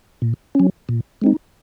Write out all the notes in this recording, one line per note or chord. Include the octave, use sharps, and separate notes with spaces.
A#2
F#3 C#4
A#2
G#3 C4 D#4